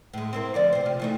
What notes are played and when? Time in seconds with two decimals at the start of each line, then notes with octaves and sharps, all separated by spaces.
0.13 A2 G#3
0.33 C4 E4 A#4
0.54 D2 F3 D5
0.73 C3 C5
0.85 C3 F4
1.00 E3 A3 D#4